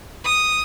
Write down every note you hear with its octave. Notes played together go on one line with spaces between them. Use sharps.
D#6